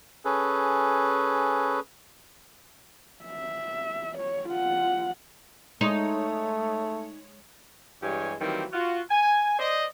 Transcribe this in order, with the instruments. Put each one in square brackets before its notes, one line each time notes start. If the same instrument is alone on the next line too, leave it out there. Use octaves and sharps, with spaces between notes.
[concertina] C#4 G#4 A4 B4
[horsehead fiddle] E5
C#5
F4 F#5
[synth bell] G#3 C#5 D#6 [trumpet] A3 [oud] D#4
[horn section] G2 E3 G#3 G4 C#5 G#5
D#3 E3 F#3 G3 A#3 C4
F4 F#4
G#5
C5 D5 D#5